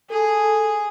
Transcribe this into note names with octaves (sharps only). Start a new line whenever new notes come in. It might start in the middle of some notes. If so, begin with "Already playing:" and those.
G#4 A4